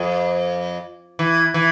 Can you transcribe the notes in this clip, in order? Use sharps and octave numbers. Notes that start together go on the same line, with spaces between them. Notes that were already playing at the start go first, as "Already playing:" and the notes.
Already playing: F2
E3
E3